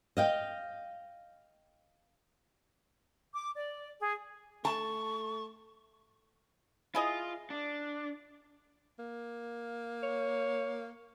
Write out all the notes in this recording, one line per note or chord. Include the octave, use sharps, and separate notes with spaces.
D#5 F5 G5
D6
D5
G#4
A3 A5 C#6
E4 F4 G#4 D#5
D4
A#3
C#5